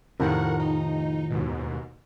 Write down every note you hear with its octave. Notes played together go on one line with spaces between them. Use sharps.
F2 A2 C3 D#3 F3 A#4 F#5
D#4
D#2 G#2 B2